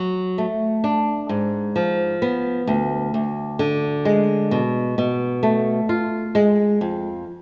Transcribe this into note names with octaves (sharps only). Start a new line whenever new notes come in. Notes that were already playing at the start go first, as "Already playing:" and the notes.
Already playing: F#3
A3
D4
G#2
F3
B3
D2
D2
D3
G#3
B2
B2
A3
F4
G#3
F2